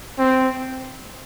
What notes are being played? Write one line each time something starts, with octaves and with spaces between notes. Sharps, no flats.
C4